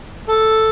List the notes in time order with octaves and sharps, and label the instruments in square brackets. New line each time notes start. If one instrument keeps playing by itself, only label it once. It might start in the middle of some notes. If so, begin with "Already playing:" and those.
[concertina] A4